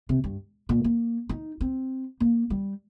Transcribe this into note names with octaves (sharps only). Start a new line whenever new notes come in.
C3
G2
A#2
A#3
D#4
C4
A#3
G3